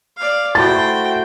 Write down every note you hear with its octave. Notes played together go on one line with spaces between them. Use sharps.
D5 F5
A3 E4 F#4 C5 G5 A6